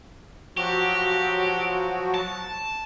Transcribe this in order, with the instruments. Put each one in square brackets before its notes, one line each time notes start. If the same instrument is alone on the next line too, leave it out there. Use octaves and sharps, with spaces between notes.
[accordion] F3 F#3 F#4 [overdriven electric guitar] G4
[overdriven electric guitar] A5